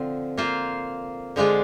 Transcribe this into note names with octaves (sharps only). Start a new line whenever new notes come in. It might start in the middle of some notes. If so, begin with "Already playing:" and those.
Already playing: D3 F3 C4 F4
A#3 F4 C5
D3 F3 G#3 D4 F4